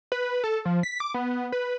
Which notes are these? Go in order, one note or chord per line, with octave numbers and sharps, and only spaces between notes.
B4
A4
F3
B6
D6
B3
B4